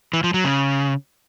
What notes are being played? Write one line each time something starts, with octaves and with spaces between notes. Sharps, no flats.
E3
F3
F#3
C#3